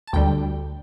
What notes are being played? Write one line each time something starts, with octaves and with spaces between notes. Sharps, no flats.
A5
D2 D3 G3 G5